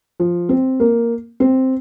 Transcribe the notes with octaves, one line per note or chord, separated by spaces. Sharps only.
F3
C4
A#3
C4